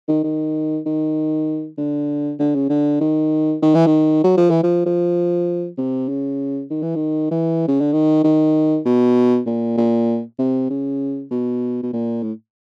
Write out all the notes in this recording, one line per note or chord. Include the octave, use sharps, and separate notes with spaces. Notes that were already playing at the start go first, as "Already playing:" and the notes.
D#3
D#3
D#3
D3
D3
C#3
D3
D#3
D#3
E3
D#3
F#3
F3
E3
F3
F3
C3
C#3
D#3
E3
D#3
E3
C#3
D3
D#3
D#3
B2
A#2
A#2
C3
C#3
B2
B2
A#2
A2